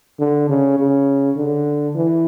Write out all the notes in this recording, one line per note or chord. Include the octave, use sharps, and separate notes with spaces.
D3
C#3
C#3
D3
E3